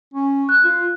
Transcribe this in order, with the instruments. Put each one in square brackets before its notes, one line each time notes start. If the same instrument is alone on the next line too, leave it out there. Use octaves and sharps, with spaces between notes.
[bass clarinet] C#4
[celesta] F#6
[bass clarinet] F4